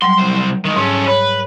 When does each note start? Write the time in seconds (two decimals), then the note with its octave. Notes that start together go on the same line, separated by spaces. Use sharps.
0.02 F#3 G3 C6
0.18 C2 C5
0.65 D#3 G#3
0.76 G#2 C#4 A4
1.08 B4 C#5